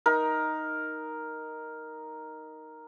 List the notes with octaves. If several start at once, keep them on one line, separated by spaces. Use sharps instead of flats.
D#4 A#4